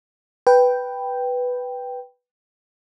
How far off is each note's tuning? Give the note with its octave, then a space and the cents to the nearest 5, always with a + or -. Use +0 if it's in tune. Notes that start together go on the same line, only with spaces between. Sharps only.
B4 +0 G5 +0